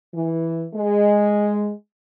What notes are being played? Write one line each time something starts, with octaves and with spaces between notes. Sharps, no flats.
E3
G#3